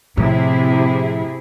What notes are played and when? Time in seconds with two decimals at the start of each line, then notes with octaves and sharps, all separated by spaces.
0.17 A2 C3 F3 E4 G#4